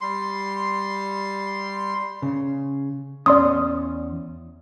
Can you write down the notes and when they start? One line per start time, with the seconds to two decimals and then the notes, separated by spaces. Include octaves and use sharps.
0.01 G3 C6
2.22 C#3
3.26 E2 C#4 D5 C6 D#6